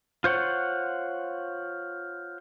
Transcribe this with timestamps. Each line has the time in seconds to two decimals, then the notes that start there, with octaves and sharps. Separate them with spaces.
0.24 F4 C5 C#5 F#5